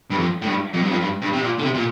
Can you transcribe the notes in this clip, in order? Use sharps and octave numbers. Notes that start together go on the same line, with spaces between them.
G2
F2
A2
G2
F2
G2
F2
G2
G2
C3
A#2
D3
C3
A#2